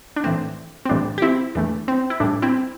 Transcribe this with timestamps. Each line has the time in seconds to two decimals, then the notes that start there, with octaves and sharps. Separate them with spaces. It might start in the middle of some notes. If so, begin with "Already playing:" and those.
0.16 D4
0.24 A2 E3 A3 C4
0.85 C4
0.89 A2 E3 G3 D4
1.18 G4
1.22 C4 E4
1.55 E2 E3 A3 D4
1.88 C4
2.10 E4
2.20 A2 E3 G3 D4
2.42 C4 E4